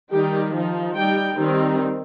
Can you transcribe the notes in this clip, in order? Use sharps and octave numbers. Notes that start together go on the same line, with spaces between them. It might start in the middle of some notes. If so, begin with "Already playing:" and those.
D#3 G3 D#4 G4
F3 D#4
G3 D#4 G5
D#3 G3 C4 D#4